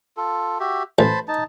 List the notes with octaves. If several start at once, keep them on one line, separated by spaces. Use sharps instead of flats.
F4 A4
F#4 G4 E5
A1 C5 A5 B5
D#4 A5